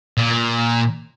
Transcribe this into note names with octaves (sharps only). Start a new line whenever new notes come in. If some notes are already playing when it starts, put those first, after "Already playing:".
A#2